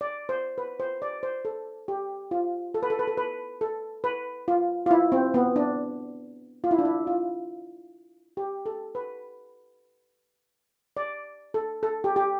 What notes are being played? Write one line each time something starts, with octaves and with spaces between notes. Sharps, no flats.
D5
C5
B4
C5
D5
C5
A4
G4
F4
A4
B4
A4
B4
A4
B4
A4
B4
F4
F4
E4
C4
B3
D4
F4
E4
D4
E4
F4
G4
A4
B4
D5
A4
A4
G4
G4